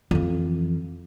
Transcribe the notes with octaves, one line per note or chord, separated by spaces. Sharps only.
F2 E3